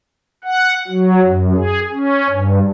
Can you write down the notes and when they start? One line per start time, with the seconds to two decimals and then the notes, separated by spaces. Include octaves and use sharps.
0.44 F#5
0.87 F#3
1.25 F#2
1.55 G#4
1.90 C#4
2.30 G2